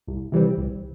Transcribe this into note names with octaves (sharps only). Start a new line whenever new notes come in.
C2
C3 E3 G3 C4
C2